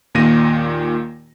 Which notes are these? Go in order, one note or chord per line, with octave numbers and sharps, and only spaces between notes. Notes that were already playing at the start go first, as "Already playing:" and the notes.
D#2 A#2 D#3 F4 A#6 D#7